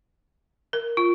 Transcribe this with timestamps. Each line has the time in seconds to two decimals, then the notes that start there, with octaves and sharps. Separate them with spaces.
0.73 A#4
0.97 F4